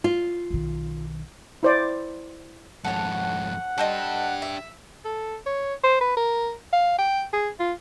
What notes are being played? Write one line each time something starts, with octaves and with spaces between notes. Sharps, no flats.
F4
B1 D#3
E4 C5 D5
F2 G#2 A4 C#5 F#5
D4 G4 A4 C5 D#5
E5
A4
C#5
C5
B4
A#4
F5
G5
G#4
F4